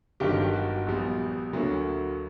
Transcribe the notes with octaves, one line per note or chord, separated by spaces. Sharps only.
G1 G2 D#3 F#3 G4
F#4
A#1 A#2 G3 B3
D2 D3 F#3 A#3